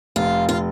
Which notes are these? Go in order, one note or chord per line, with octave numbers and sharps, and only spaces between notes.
F1 F4
F4